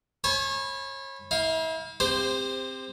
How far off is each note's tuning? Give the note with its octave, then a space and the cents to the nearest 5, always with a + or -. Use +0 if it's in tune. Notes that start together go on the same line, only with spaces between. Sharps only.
C#5 -35 G#5 +35 B5 +0
E4 -40 F5 +0
C4 +0 G4 +30 C5 -10